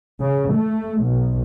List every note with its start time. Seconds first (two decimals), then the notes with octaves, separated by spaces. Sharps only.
0.22 C#3
0.54 A3
1.02 B1